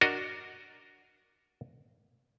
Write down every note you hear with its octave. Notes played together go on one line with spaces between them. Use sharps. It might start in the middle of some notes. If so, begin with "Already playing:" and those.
D4 F#4 A#4 D#5